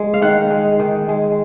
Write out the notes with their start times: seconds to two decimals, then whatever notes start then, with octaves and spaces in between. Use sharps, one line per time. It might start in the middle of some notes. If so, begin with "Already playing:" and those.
Already playing: G#3
0.14 F5
0.22 D#3 F#5
0.50 G#3
0.79 D#3
1.09 G#3